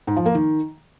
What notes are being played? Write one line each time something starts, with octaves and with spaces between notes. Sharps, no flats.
G#2
F3
A#3
D#3